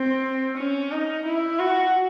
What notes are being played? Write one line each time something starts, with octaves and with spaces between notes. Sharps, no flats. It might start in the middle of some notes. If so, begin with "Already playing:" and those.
Already playing: C4
C#4
D#4
E4
F#4